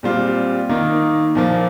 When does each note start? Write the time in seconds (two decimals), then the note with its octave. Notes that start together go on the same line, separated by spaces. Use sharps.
0.03 A#2 G3 C4 F4
0.69 D#3 A#3 D#4 A#4
1.35 A#2 F3 A#3